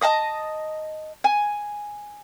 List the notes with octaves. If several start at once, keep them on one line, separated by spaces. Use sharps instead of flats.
D#5 A5 A#5 D#6
G#5